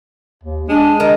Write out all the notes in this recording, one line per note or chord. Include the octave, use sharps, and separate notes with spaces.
D#2
G#3 D4
D#3 A#4